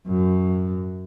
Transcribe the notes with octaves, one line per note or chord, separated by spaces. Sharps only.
F#2